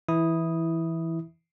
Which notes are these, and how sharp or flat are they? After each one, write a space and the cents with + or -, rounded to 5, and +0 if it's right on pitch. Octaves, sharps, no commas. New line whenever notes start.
E3 +0 E4 -10 D#6 +0